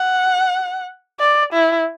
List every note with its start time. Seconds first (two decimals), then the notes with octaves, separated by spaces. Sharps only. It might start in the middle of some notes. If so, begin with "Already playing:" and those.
Already playing: F#5
1.20 D5
1.53 E4